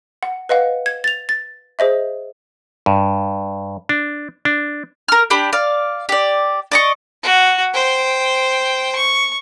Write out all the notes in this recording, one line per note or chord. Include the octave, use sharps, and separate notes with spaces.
F#5
B4 D#5 F5 F#5
G#6
A6 F7
A6
G#4 C5 D#5 E5
G2
D4
D4
A#4 F6
D4 G4 B5
D5 F5
G4 D5
D5 D#5 C#6
F#4
C5 G5
C#6